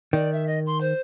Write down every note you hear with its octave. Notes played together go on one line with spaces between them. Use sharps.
D#3 D5
E5
D#5
C6
C5